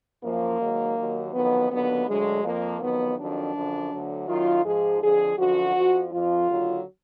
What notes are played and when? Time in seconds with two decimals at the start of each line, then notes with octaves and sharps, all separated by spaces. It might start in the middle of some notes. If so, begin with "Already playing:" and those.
0.23 F#2 F3 A#3
0.60 G#2 D#3 F#3
0.96 D#2 D#3 F#3
1.33 F2 D#3 F#3 B3
1.70 D#2 D3 F#3 B3
2.06 D2 D3 F#3 G#3
2.43 F2 F3 A#3
2.80 F2 D#3 F#3 B3
3.17 F2 D#3 F#3 D4
3.54 F#2 D3 F3
3.91 D2 D3 F#3
4.27 F#2 D#3 F#3 F4
4.64 G#2 F3 G#4
5.01 F2 D3 F3 G#4
5.37 F#2 D3 F3 F#4
5.74 F2 F3
6.11 F2 F3 F4
6.48 D#2 D3 F#3